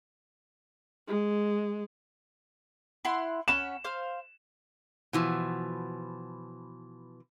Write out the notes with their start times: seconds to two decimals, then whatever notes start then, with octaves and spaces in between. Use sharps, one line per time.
1.08 G#3
3.05 E4 F#5 C6
3.48 C#4 F#5 B5 E7
3.84 C5 F5 F6
5.13 B2 E3 F3